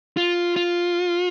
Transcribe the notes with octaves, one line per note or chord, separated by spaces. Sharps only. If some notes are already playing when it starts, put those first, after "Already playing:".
F4
F4